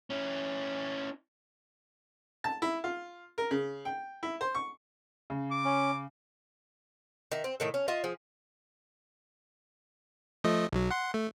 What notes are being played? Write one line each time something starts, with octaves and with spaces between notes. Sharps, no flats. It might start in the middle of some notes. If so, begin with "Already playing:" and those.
C#4 E4
A5
E4
F4
A#4
C#3
G5
E4
C5
C#6
C#3
D6
C#4
D#3 E5
C4
A2 D#3 A4
C#4
F4 D#5 E5
F3 G#4
F3 A3 D#5
B1 F#3
F#5 C6
A3